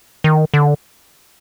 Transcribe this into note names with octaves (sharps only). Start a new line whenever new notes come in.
D#3
D3